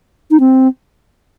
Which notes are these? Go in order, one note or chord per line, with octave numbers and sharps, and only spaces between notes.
D#4
C4